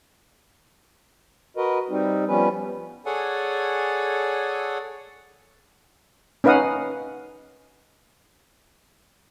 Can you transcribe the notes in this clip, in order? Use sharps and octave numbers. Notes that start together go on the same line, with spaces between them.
F#4 A#4 B4 D#5
G3 C4 D#4
F3 G3 B3 C#4 B4
G#4 A4 C#5 D5 F#5 G#5
C#4 D#4 B4 F5 F#5 D#6